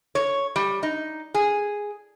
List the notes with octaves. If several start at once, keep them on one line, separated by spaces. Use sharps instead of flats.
C#5
G3
D#4
G#4